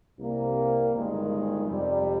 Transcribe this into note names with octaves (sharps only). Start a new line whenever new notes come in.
C2 C3 G3 A#3
G1 G2 D#3 G#3
F2 C3 G3